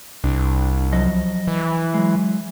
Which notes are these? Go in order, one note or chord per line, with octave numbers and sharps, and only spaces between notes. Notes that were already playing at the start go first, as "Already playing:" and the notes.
C2 D4
F3 F#3 D#5
E3
F#3 G#3